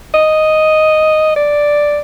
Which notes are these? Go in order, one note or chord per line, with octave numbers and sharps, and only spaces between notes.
D#5
D5